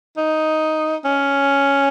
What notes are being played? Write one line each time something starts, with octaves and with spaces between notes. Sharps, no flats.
D#4
C#4